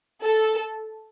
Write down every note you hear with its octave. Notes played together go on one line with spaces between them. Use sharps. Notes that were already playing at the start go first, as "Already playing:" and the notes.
A4